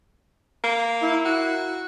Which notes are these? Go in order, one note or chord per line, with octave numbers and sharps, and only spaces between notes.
A#3
E4
F#4